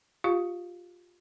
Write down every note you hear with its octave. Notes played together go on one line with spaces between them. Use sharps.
F4 G4 F5